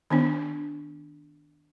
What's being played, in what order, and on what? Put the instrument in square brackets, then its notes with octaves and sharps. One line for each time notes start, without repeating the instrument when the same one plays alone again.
[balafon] D#3 B3 D4